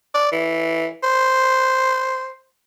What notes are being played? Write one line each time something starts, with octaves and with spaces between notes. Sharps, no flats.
D5
E3
C5